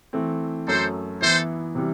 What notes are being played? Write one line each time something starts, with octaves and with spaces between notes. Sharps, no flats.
E3 A3 C4
F#2 F#3 A3 A4 C5
E3 B3 E4 A4 C5
C3 E3 G3